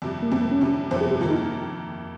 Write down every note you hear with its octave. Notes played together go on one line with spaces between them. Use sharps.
F2 C3 G3
A#3
F2 C3 G3 C4
A#3
C#4
F2 C3 G3
F2 C3 G3 C5
G#4
G4
F2 D#3 A#3 F4
D#4